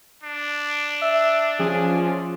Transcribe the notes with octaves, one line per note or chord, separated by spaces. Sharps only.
D4
E5
F3 C#4 F4 G#4